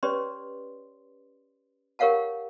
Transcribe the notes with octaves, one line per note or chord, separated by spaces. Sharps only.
C#4 G4 B4 C#5 D5 C6
G4 A#4 C#5 F5 F#5 A5